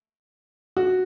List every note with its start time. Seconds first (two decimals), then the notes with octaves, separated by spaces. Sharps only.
0.77 F#4